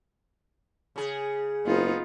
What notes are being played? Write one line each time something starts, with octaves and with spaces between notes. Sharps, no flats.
C#3 G#4
F#1 B3 D#4 F4